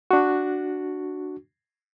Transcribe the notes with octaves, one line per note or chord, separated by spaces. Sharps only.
D4 F#4